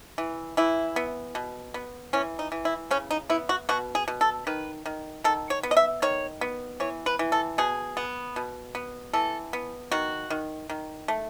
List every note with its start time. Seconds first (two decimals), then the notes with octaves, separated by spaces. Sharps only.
0.18 E3
0.57 E3 E4
0.96 B3
1.35 B2
1.74 B3
2.13 E3 C#4
2.39 D#4
2.52 E3
2.65 E4
2.91 C#3 C#4
3.11 D#4
3.30 B3 E4
3.49 F#4
3.69 B2 F#4
3.95 G#4
4.08 B2
4.21 A4
4.47 D#3 B4
4.86 D#3
5.24 D#3 A4
5.50 C#5
5.63 B3
5.71 D#5
5.77 E5
6.02 D#3 C#5
6.41 B3
6.80 E3 C#5
7.06 B4
7.19 E3
7.32 A4
7.58 B2 G#4
7.97 B3
8.36 B2
8.75 B3
9.13 E3 A4
9.53 B3
9.92 D#3 F#4
10.30 D#3
10.70 D#3
11.08 A3